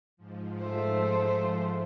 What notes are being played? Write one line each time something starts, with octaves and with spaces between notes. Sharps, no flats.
G#2 F3
A3 C5